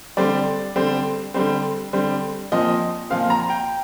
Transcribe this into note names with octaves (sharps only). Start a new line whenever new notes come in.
D3 G3 C4 D5
D3 G3 C4
D3 G3 C4
D3 G3 C4
A#2 F3 C4 D#5
A#2 F3 C4 F5
A#5
G5